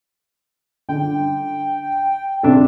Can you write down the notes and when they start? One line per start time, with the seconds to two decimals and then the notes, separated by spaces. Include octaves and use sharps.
0.89 D3 G5
2.43 C3 D4 A4